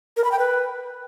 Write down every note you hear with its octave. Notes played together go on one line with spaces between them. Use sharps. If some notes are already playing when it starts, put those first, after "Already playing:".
A#4
B5
G5
B4